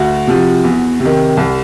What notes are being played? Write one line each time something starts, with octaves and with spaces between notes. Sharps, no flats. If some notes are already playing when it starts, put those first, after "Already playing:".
Already playing: D2 F#4
C3 F3
E2
C3
D#3
C2